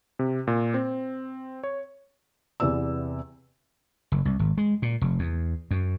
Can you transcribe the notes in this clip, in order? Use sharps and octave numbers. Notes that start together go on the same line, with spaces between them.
C3
A#2
C4
C#5
E2 C3 B3 D5 E6
F#1
C2
G#1
G#3
A#2
F1
E2
F#2